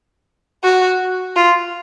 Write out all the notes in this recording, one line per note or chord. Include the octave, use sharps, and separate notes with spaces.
F#4
F4